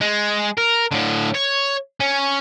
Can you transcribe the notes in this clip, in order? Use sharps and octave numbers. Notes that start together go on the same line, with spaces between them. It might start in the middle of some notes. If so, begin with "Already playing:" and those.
G#3
A#4
A2 D3
C#5
C#4